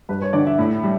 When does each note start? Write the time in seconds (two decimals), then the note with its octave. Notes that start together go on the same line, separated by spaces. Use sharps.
0.09 G2 B4
0.22 C#5
0.33 D3 G3 D5
0.47 E5
0.58 A2
0.83 G3